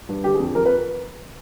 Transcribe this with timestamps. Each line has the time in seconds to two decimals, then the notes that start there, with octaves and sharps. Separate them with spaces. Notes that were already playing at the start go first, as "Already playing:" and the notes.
0.09 G2
0.24 D3 G4
0.34 G#4
0.40 F2
0.55 F2 A#4
0.66 B4